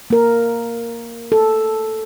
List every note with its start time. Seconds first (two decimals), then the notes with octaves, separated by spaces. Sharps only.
0.10 A#3 A#4
1.32 A4